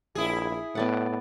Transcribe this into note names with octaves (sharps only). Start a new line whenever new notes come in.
A#1 E4 G#4
A2 B3 D5 F#5